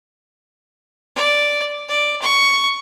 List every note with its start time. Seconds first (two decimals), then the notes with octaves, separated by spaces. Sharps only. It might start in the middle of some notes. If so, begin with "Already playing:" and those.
1.16 D5
1.89 D5
2.22 C#6